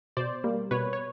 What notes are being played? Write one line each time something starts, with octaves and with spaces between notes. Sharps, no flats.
B2 C5 D5
G3 A#3
B2 B4 C#5
C#5